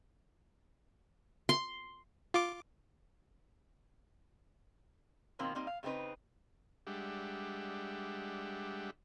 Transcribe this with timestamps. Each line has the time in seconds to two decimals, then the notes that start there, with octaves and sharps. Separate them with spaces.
1.49 C6
2.34 F4 D6
5.39 B2 D#3 F3 A#3 C4
5.55 G3 A#3 C4 D#4
5.67 F5
5.83 C#3 A3 C4 D#4 B4
6.87 G3 G#3 D4 G4 E5 F#5